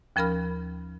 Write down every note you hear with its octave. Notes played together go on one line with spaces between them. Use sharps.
D#2 F3 C#4 A#4 B5 F6